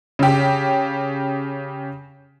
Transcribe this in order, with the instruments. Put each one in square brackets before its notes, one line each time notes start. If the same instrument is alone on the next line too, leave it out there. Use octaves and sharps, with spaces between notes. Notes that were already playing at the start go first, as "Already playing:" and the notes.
[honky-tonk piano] C#3 G4